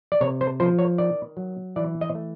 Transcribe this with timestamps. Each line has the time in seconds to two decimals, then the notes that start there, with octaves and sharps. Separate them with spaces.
0.12 D5
0.21 C3 C#5
0.41 C5
0.60 F3 C5
0.79 C#5
0.98 D#3 D5
1.37 F#3
1.76 E3 D5
2.01 D#5
2.15 A3